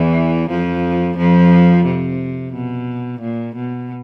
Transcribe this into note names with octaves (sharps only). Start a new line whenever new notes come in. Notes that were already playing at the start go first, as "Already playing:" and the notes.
Already playing: E2 E3
F2 F3
F2 F3
C3
B2
A#2
B2